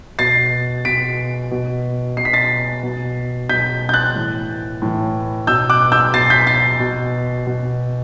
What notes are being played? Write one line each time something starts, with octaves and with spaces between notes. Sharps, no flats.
B2 A6 C7
B2 B6 D7
B2
B2 C7
B6
A6 C7
B2
B2 G6 B6
G6
F#6 A6
A2 E3
A2 E3
B2 E6 G6
D6 F#6
E6 G6
B2 A6 C7
G6 B6
A6 C7
B2
B2